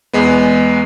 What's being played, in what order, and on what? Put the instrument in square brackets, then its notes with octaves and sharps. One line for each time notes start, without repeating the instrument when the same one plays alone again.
[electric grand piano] E2 G#3 B3